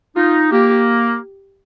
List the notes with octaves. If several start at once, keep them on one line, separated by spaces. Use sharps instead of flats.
D#4 F4
A#3 G4